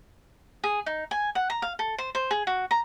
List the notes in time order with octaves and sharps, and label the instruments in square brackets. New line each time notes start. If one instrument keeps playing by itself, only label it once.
[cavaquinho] G#4
D#4
G#5
F#5
A#5
F5
A4
C5
C5
G#4
F#4
A#5